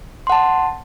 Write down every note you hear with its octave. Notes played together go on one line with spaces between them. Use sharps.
F#5 A5 C6